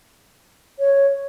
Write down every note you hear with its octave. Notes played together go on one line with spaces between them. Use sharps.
C#5